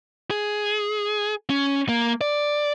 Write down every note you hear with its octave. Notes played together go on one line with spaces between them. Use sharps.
G#4
C#4
A#3
D5